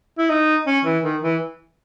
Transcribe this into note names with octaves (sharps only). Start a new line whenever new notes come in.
E4
D#4
C#4
E3
D#3
E3